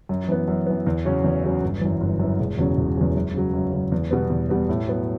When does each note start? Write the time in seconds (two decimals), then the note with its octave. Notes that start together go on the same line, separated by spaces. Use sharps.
0.09 F#2
0.29 E3 B3
0.48 F#2
0.66 E3 B3
0.87 E2
1.05 C#3 F#3 C#4
1.24 E2
1.43 C#3 F#3 C#4
1.63 G1
1.81 F#2 E3
2.01 G1
2.20 F#2 E3
2.40 E1
2.58 E2 C#3 F#3 C#4
2.77 E1
2.96 E2 C#3 F#3 C#4
3.15 F#2
3.35 C#3 F#3
3.54 F#2
3.73 C#3 F#3
3.92 E2
4.11 B2 G3 B3
4.30 E2
4.49 B2 G3 B3
4.69 A2
4.87 F#3 B3